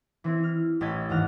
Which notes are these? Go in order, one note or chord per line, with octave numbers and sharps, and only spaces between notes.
E3 C4 E4
F6
A1 A2 D#5 A5 G#6 B6
D#2 G#2 E3 F5 F#5 F6